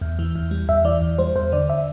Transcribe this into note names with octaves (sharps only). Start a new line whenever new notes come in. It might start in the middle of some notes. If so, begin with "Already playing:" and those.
E2
E3
E2
G3
E2 E5
E3 D5
E2
G3 C5
E2 C5
D3 D5
E5